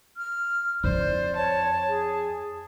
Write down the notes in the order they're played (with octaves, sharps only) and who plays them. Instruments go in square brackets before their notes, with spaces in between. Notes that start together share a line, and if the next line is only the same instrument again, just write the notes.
[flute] F6
[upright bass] F2 E4 [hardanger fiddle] C5 [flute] D5
[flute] C#5 [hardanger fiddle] A5
[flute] G#4